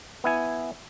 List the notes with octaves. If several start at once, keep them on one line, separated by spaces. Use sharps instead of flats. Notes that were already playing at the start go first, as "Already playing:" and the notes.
B3 E4 G#5